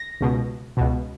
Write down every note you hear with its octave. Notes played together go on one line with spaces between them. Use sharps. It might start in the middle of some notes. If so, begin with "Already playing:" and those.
Already playing: A#6
C#2 B2
C#2 B2